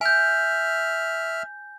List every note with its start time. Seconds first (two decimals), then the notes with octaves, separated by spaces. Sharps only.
0.01 E5 G#5 F6 G6